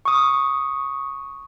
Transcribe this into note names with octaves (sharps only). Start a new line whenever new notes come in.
C#6 D#6